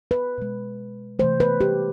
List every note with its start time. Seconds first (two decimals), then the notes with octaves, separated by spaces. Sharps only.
0.11 B4
0.38 B2 G#3
1.19 C3 E3 A3 C5
1.40 B4
1.61 G4